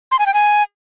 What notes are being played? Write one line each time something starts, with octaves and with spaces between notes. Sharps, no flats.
C6
G#5
G5
G#5